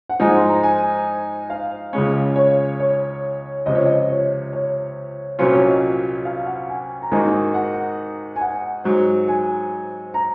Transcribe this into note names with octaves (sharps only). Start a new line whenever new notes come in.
F#5
G#2 F3 G#3 D#4 G#5
C6
A#5
G#5
F5
C#2 C#3 G#3 C#4
C#5
C#5
C#2 C3 F3 D#5
C#5
D#5
C#5
C#5
C2 A#2 F#3 C#4 F4 C5
C#5
D#5
F5
F#5
G#5
A#5
G#2 D#3 A#3 D#4 F#4 G#5
F#5
G#5
F#5
G#2 F#3 C4
G#5
A#5